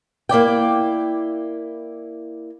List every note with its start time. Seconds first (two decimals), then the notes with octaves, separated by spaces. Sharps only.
0.29 A#3 E4 D5 G5